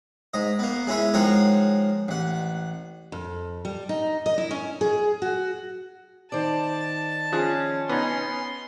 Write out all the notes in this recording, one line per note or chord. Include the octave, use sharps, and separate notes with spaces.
G#2 D#5
A#3 B3
G#3 C#4 E4 C#5
D#3 F3 G#3 A#4 C#5 F#5
A1 F#5
F2
G3
D#4
D#5
E4
C#4
G#4
F#4
D#3 C5 D5 A5
F3 C#4 G#4 F#6
B3 D#4 C6